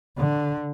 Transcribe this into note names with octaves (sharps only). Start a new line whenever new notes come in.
D3